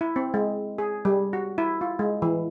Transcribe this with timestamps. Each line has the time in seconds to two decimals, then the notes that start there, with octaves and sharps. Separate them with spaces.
0.01 E4
0.16 C4
0.34 G#3
0.78 G#4
1.05 G3
1.33 F#4
1.58 E4
1.81 F4
1.99 G#3
2.22 E3